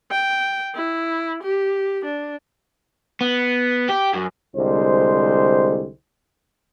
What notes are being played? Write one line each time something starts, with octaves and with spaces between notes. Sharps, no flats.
G5
E4
G4
D4
B3
G4
F#2
C2 D3 G#3 C5